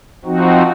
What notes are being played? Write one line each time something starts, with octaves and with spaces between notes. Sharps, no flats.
F3 C4 D#4 F#4